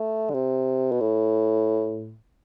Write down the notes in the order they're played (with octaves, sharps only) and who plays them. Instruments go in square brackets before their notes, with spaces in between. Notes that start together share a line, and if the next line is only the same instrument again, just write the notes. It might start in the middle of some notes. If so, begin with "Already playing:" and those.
Already playing: [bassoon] A3
D3
C3
B2
A2